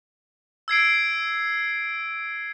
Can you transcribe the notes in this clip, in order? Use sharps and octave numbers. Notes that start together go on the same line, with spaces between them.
E6 G#6 C7 D7